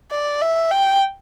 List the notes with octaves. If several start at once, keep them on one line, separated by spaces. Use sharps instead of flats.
D5
E5
G5